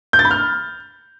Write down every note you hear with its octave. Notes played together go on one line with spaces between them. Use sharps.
G6
A6
B5
F6